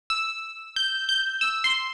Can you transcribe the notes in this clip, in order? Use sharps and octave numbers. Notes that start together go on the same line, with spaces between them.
E6
G6
G6
E6
C6